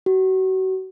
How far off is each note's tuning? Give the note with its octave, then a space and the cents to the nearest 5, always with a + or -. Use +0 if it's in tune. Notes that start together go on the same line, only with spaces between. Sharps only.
F#4 +30